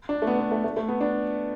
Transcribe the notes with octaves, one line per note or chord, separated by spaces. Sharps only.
D4
A3
B3
B3
A3
A3
A3
B3
D4